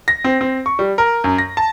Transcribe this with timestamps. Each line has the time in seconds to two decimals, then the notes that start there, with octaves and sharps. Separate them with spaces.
0.08 A#6
0.24 C4
0.41 C4
0.66 C#6
0.79 G3
0.98 A#4
1.24 F#2
1.38 A#6
1.57 A5